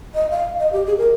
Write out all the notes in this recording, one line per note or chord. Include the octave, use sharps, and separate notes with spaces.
D#5
F5
D#5
G4
G#4
A#4